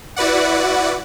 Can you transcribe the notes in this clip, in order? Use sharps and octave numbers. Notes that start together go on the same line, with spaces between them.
E4 F#4 B4 D5 F#5